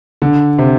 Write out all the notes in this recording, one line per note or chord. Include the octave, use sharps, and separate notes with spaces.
D3
C3